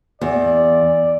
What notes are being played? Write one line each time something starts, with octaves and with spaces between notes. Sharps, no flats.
E2 D5